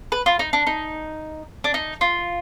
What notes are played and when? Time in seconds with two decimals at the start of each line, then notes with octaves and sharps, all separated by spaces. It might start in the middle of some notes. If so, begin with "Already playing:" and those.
0.12 B4
0.26 F4
0.39 D#4
0.53 D4
0.67 D#4
1.64 D4
1.74 D#4
2.01 F4